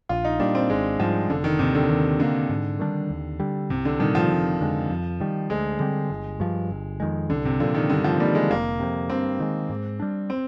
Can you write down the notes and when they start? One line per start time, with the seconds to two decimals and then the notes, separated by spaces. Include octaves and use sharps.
0.09 A#1 F4
0.24 D#4
0.40 A#2 G3 D4
0.55 C4
0.70 G#1 G#3
1.00 G#2 F3 G3 C4
1.30 F1 D3
1.44 D#3
1.59 D#2 C3 D#3
1.75 D3
1.90 D#2
2.19 D3 D#3 A#3
2.50 G#2
2.79 D#3 G3 D4
3.10 D#2
3.40 D3 G3
3.70 C2 C3
3.85 D3
3.99 A#2 D#3 G3 D4
4.15 F3
4.30 F1
4.60 F2 D3 G#3
4.90 F2
5.20 D#3 G3
5.50 D2 G#3
5.80 D3 G3 C4
6.10 G1
6.40 G2 F3
6.71 G1
7.00 F2 D#3 G#3
7.30 C2 D3
7.45 C3
7.60 A#2 D3 F3
7.74 D#3
7.89 G2 D3
8.04 F3
8.20 D#3 G3 A#3
8.35 G#3
8.51 F1 A#3
8.80 F2 C3
9.10 G2 C4
9.40 D#3 G#3
9.70 G#2
10.00 G3 D4
10.30 C4